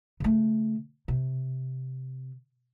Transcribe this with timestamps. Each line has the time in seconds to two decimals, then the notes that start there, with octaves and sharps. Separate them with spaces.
0.20 C#3 A3
1.08 C3